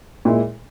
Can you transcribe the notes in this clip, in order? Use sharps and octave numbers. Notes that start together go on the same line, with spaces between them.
A#2 G#3 E4